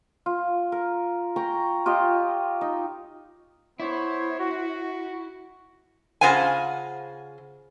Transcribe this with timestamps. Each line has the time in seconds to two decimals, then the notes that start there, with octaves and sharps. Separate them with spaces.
0.26 F4
0.72 A#4
1.36 G5 G#5 A#5 C#6
1.86 F4 G4 C#5 D#5
2.61 D#4
3.80 B3 E4 C5 C#5
4.39 F#4
6.21 C#3 F4 C5 F#5 G#5